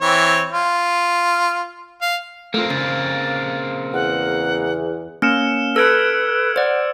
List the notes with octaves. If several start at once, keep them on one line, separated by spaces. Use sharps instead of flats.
E3 C4 C#5
F4
F5
A3 A#3 C4 F4
C#3 A6
E2 F#5
A#3 C#4 F6 C#7 E7
A4 B4 E6 G#6 D7
C5 D5 F#5